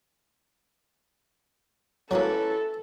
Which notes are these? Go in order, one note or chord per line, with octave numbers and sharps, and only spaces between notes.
F#3 A#3 C#4 E4 A4 B4